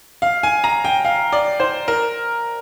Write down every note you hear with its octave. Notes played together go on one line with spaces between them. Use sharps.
F5
G#5
A#5
G5
F5
D5
C5
A#4